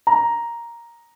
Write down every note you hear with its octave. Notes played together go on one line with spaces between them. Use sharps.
A#5